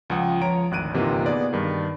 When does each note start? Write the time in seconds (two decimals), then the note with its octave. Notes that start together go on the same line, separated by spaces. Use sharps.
0.10 C#2 F3 F4 F#5 G5 D#6
0.41 F3 C#5 A#5 D7
0.71 G#1 D2 F#6 D7 D#7
0.94 G1 C3 E3 A#3 D#4 F4
1.26 B3 G#4 D5
1.53 G2 D#3